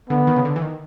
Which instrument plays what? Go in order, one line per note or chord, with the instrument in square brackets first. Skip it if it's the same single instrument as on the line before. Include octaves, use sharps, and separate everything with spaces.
[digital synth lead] D3 [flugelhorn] B3
[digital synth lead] D#3
C#3
D3
E3
D#3